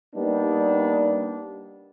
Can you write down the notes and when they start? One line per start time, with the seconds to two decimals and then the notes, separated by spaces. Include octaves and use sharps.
0.15 G3 A#3 B3 D4 D#4